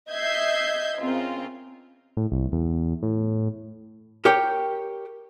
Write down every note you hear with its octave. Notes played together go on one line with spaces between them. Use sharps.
D#5 E5 G6 G#6 C7
C#3 C4 F4 A#4
A2
C2
E2
A2
G4 A#4 C#5 G5